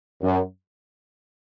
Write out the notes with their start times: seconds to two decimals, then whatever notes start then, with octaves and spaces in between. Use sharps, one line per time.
0.23 F#2